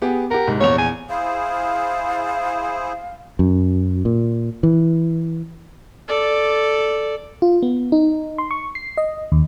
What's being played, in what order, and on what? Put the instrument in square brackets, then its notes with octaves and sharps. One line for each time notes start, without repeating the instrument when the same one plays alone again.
[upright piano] B3 G4 G#4
[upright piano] G4 F#5 [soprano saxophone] A#4
[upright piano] C2 G#2
[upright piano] A#1 E2 F7 [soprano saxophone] C#5
[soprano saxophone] G#5
[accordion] E4 G#4 C5 [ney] F5
[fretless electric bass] F#2
A#2
E3
[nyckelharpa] A4 D5
[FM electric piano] F4
B3
D#4
C6
C#6
C7
D#5
D#2